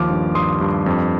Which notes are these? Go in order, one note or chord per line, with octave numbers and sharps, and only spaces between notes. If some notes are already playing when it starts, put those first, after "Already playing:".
Already playing: D#2 F3 D6 F6
G2
G2 C6 D#6
G2
F2